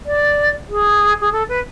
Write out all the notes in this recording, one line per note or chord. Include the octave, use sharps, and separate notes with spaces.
D5
G#4
G#4
A4
B4